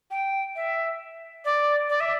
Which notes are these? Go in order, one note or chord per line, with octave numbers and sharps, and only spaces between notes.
G5
E5
D5
D5
E5